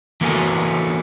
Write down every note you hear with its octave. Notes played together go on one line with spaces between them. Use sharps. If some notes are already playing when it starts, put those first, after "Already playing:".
E3 A#3 B3 F#4 A4 G#5